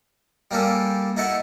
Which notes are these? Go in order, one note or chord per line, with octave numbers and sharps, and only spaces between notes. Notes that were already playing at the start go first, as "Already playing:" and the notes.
G3 A#3 C#4 G4 A4
D#4 E4 A4 F#5 C#6